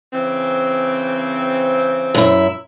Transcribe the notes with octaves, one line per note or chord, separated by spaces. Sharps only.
C#3 E3 C4
F#2 E4